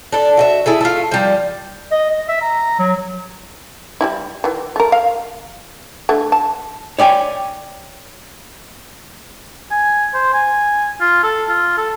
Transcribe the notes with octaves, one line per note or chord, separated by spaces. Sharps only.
D4 A4
F#4 D#5 E5
E4 G#4 A4
A3 F4
F3 G3
D#5
D#5
E5
A#5
F#3
G3 D#4 E4
D#3 E3
A3 A#4
F5
D3 A3
A5
C#5 D5 G5 G#5
G#5
C5
G#5
F4
A4
F4
A4